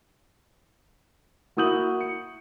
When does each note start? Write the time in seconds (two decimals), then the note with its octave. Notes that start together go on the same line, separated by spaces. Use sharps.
1.57 A#3 E4 F#4 D#6 G6 F#7
2.01 C#7